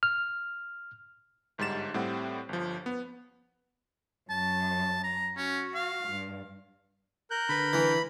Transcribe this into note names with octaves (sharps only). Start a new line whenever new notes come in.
F6
G1 G#2 G3 A6 E7
A2 G3 C4 F#5
G1 F3
B3
F#2 A5
A#5
C#4 F#4
F5
G2
A#4 F#6 G6
D3 B4 B5
E3